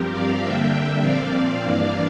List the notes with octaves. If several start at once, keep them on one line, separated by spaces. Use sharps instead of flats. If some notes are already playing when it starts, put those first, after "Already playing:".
Already playing: G2 F3 C4 G4 A#4
D5 F5
D3 G3 A#3 D4 E5 G5
A#2 F3 C4 D5 F5
G2 E3 A#3 D4